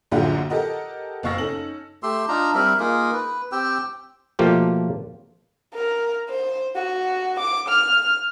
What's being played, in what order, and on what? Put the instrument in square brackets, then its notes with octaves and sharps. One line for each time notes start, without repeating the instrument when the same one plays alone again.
[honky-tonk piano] A#1 F#2 D3 F4 G4 F#5
G4 A4 A#4 D#5 F#5
F#1 B2 F5 C#6 E6 A#6
C#4 D#4 A4 F#7
[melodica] A3 G4 C6 E6
D4 D#4 F4 A#5
G3 C4 A#4 E5
A#3 D#4 F4 G#4
B4
C4 G4 G5 E6
[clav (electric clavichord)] B2 F3 A3 A#3 F4 G4
[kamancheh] A#4
C5
F#4
D6
F6